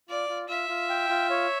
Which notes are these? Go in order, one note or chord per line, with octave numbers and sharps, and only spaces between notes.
F4 D5
F4
F4 E5
F4
G5
F4
C#5